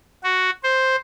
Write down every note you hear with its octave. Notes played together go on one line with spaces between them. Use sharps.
F#4
C5